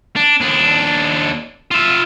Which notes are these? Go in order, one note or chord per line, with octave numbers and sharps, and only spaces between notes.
D4
D#2 D4
F4 E5